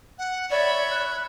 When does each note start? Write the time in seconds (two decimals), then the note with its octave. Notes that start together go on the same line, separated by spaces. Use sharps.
0.18 F#5
0.50 C#5 D5 E5 B5
0.91 F#6